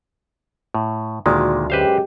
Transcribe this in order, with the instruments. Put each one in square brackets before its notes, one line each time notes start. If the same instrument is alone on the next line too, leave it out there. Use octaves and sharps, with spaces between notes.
[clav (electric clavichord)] A2
[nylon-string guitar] D2 F#4 D5 [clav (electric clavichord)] A#2 D#3 G#3
[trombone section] F#2 G#3 G4 [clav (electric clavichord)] B4 C5 F5